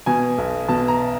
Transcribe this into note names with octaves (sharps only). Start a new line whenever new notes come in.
B2 G#5
B1
B2 A5
A#5